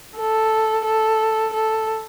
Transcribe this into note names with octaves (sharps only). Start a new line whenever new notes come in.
A4
A4
A4